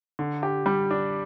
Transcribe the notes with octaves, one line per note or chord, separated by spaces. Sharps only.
D3
G4
G3
D4